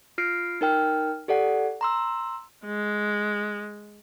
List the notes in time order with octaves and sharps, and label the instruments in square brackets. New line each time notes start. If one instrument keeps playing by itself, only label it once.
[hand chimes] F4 F6 C7 D7
D#4 A#4 G5 F6
G4 A4 D5 F#5
A#5 C6 E6
[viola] G#3